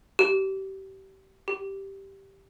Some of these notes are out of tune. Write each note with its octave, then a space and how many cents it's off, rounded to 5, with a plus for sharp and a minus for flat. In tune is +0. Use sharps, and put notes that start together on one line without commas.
G4 -30
G4 -5